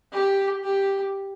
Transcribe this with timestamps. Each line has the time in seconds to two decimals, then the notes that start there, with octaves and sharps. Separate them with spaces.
0.12 G4
0.63 G4